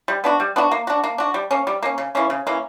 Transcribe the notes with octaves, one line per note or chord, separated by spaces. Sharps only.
G3
B3 D4 F#4
G3
B3 D4 F#4
A#3
D4 F#4
A#3
D4 F#4
G3
A#3 C#4
G3
A#3 C#4
C#3
E3 A#3 C#4
C#3
E3 A#3 C#4